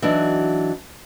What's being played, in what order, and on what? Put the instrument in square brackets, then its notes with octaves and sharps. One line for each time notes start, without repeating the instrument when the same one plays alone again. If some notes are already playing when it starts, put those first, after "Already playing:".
[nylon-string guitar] E3 F#3 D4 D#4 F#4